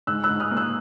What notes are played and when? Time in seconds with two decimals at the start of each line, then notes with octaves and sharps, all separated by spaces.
0.07 G#2 E6 F#6
0.24 E6 F#6
0.29 G#2
0.40 D#6 F6
0.51 A#3
0.57 E6 F#6